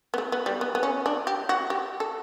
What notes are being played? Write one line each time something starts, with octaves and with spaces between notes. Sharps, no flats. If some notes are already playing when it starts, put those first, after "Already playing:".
B3
A3
B3
G3
B3
B3
C#4
D4
G4
F#4
G4
A4